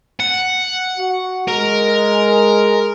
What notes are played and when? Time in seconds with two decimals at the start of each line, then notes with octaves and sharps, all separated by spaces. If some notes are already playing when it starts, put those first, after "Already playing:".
0.20 F#5
0.97 F#4
1.48 G#3 A#4